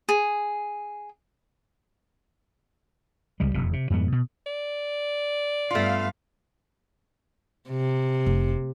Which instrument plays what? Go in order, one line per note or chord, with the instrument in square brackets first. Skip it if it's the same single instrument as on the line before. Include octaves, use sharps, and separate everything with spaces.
[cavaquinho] G#4
[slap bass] C#2 G3 G#3
F1 E2 B2
C3
F2 G#2 G3 B3
B2
[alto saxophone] D5
[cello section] G2 B3 F5 [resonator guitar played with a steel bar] A3 F4
[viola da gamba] C3
[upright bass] F1